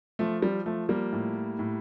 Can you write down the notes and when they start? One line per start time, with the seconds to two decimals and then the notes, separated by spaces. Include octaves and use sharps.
0.19 F3 A3
0.42 G3
0.66 F3 A3
0.89 G3 A#3
1.13 A2
1.59 A2